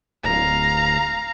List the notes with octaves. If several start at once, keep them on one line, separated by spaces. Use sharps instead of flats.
D1 F5 A#5